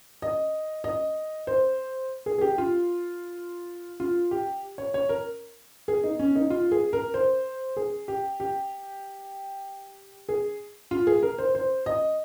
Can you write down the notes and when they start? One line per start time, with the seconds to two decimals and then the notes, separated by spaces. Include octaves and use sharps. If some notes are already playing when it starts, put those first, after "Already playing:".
0.22 D#5
0.84 D#5
1.47 C5
2.26 G#4
2.38 G#4
2.41 G4
2.58 F4
4.00 F4
4.31 G4
4.78 C#5
4.94 C#5
5.09 A#4
5.88 G#4
6.04 D#4
6.19 C#4
6.36 D#4
6.50 F4
6.72 G#4
6.93 A#4
7.14 C5
7.77 G#4
8.08 G4
8.40 G4
10.29 G#4
10.91 F4
11.07 G#4
11.23 A#4
11.38 C5
11.55 C5
11.86 D#5